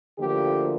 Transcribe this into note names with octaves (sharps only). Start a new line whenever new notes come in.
D2 D3 F3 A#3 G4